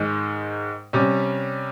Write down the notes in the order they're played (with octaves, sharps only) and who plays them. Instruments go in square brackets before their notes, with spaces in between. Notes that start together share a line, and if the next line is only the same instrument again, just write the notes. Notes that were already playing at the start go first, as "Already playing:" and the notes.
Already playing: [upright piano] G#2 D#3 G#3
C3 G3 C#4